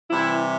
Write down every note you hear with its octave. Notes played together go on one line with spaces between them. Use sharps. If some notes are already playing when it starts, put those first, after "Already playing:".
C3 E3 G3 E4